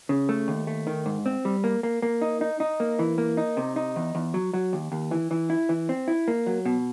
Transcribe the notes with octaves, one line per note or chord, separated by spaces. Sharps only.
C#3
A3
D#2
A3
D#3
G#2
C4
G3
A#3
A#3
A#3
D#4
D#4
D#4
A#3
E3
A#3
D#4
C3
D#4
E2
E2
F#3
F#3
D#2
D#2
E3
E3
E4
E3
C4
E4
A#3
F#3
B2